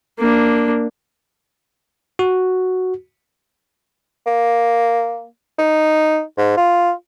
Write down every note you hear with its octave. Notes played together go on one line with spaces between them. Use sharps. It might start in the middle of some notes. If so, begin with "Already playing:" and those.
A#3 D4
F#4
A#3
D#4
G#2
F4